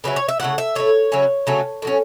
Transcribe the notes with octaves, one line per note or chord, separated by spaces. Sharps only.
C#3 F#3 C#4 E4 B4
C#5
E5
C#3 A3 E4 F#5
E5
A2 A3 E4 C#5
C#3 F#3 C#4 E4
C#3 F#3 A3 C#4
A2 F#3 C#4